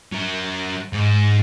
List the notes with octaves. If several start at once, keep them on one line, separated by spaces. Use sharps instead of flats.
F#3 A#4
G#2